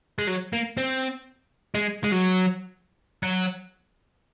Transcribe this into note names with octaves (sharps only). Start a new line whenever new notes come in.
G#3
F#3
A#3
C4
G#3
G#3
F#3
F#3